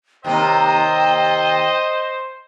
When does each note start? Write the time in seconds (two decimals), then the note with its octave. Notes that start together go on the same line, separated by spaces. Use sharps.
0.25 D#2 C3 A#3 C5 D#5 G5